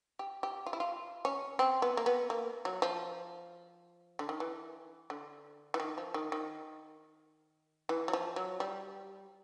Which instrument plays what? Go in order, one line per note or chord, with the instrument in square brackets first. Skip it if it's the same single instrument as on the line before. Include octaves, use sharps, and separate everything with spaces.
[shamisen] G4
G4
F4
E4
F4
C#4
C4
B3
A#3
B3
A#3
F#3
F3
D3
D#3
E3
D3
E3
D#3
F3
D#3
D#3
E3
F#3
F3
F#3
G3